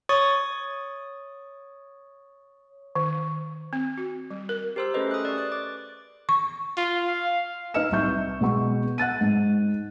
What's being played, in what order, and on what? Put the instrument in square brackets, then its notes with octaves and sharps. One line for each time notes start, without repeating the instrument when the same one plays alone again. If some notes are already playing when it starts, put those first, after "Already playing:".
[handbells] C#5 C#6 D#6 A6
[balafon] D#3
C4
F#4
G3
A#4
[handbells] G4 A#4 C5 C6 E6
A3 C#4 G#4 A4 B4 D#5
D#6 F#6
D5 C#6
F#6 A6
D6
[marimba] C#6
[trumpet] F4
F5
[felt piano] D#4 B4 D#5 F6 C#7 E7
C2 E5 C#6 G6
B2 G#3 B3 C#6
F#5 F#6 A6 D#7
G#2